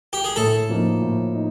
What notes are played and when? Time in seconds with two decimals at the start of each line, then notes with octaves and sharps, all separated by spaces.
0.13 G4
0.24 G#4
0.36 A2 A4
0.69 F3 A#3 D#4
1.02 A2
1.34 D#4